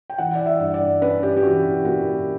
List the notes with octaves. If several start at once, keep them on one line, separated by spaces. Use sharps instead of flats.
G5
E3 F#5
D5
E5
G2
D5
C#4 B4
G4
G4
E3 F#4
A#3 F#4